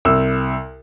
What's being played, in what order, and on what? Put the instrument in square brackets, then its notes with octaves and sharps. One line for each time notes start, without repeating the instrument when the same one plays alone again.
[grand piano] C2 E6